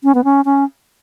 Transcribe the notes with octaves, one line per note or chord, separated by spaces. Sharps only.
C#4
B3
C#4
C#4